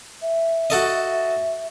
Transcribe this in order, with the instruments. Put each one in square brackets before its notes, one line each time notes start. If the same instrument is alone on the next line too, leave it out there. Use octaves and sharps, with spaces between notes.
[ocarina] E5
[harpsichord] F#4 A4 D#5